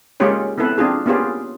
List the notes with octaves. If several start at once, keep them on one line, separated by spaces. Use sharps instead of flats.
G#3 A#3 C#4 F4 G4 C#5
B3 C4 E4 A4 B4
C4 D4 F4 G#4
A#3 B3 C#4 F4 G4 G#4